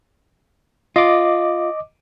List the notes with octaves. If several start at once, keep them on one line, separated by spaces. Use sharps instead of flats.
F4 D#5 D6